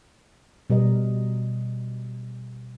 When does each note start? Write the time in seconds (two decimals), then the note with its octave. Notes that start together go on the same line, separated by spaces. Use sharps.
0.70 B2 G3 A#4 D#5